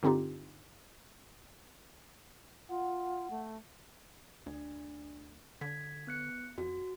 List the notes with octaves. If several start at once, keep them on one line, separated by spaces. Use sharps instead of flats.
G2 D3 C4 D#4 F4 G4
F4 F#5
A3
D2 D4
D3 G#6 B6
B3 F#6 C#7
F2 F#4